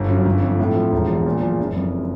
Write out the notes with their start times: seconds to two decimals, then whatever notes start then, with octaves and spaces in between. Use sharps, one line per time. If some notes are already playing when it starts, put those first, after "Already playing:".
Already playing: G1
0.09 F#2
0.26 G1
0.43 F2
0.59 A2
0.75 F3
0.92 E1
1.09 E2
1.26 A#2
1.42 F3
1.60 F#1
1.76 F2